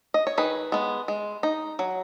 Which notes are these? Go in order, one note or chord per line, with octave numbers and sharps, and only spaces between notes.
D#5
C#5
D#3 G#4 B4
G#3 B3
G#3
D#4
F#3